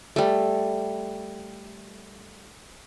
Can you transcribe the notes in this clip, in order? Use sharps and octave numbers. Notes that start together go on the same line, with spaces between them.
G3 A3